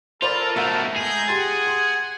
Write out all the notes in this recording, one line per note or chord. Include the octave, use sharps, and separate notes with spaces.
F4 A4 A#4 C5 D5 B5
B2 A3 E5 F#5
G#3 G#4 A#5 G6 D#7
G4 F#5 G#5 C6 A6
C6